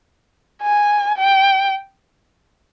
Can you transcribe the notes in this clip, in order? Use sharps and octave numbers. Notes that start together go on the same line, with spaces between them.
G#5
G5